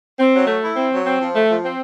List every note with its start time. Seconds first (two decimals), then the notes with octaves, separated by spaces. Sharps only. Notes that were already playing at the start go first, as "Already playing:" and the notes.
0.19 C4
0.34 F#3
0.47 A3
0.61 E4
0.76 C4
0.91 F#3
1.05 C4
1.19 F3
1.34 A3
1.48 F3
1.63 C4